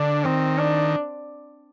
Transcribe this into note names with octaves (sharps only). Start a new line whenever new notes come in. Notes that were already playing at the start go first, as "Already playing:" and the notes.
Already playing: D3 D4
D#3 C4
D4